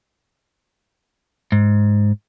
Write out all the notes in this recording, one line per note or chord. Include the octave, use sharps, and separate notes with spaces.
G#2